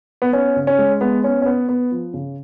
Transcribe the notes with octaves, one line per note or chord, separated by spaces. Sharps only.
B3
B3 C#4
C#3
C#4
G#3
G#3 B3
B3 C#4
C#4
B3
B3
F3
C#3